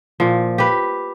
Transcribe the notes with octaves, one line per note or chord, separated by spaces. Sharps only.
A#2 F3
G4 B4